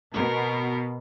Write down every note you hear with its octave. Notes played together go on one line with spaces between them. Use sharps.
B2 A#4